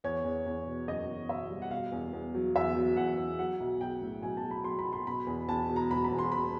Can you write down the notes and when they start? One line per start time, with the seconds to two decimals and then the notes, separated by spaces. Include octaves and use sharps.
0.04 E2 C#5
0.24 E2
0.46 E2
0.67 B2
0.87 F#1 D#5
1.09 E2
1.29 B2 E5
1.50 G3
1.62 F#5
1.71 B2 F5
1.92 E2
2.13 E2
2.34 F#3
2.55 E2 E5
2.76 F#3
2.97 E2 F#5
3.17 E2
3.39 F#3 F#5
3.60 B1
3.81 B1 G5
4.02 A2
4.23 B1 G#5
4.37 A5
4.43 B1
4.51 B5
4.64 F#3 C6
4.79 B5
4.85 B1
4.93 C6
5.07 B2 B5
5.27 E2
5.48 E2 A5
5.70 B2
5.76 A#5
5.90 E1 B5
6.04 B5
6.12 E1
6.18 C6
6.32 E1 B5